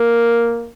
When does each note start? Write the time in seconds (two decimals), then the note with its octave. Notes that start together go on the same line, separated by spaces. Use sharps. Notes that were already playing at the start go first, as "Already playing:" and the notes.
Already playing: A#3